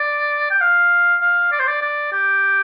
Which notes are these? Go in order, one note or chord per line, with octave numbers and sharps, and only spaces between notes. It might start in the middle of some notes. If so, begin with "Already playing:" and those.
Already playing: D5
G5
F5
F5
D5
C5
D5
D5
G4